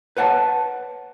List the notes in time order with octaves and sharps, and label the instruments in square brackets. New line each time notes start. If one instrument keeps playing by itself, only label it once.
[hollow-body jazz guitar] B4 C#5 F#5 G5 A5